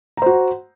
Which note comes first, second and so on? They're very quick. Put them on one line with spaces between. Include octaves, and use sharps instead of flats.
A#5 C5 F#4